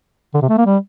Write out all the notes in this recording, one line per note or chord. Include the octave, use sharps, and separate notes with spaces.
D3
C3
A3
A#3
G3